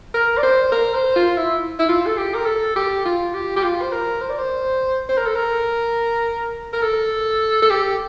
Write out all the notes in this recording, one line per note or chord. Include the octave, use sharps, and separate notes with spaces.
A#4
D5
C5
A#4
C5
F4
E4
E4
F4
A4
G4
A#4
A4
G4
F4
G4
G4
F4
C5
A#4
C5
D5
C5
C5
A#4
A4
A#4
A#4
A4
A4
G4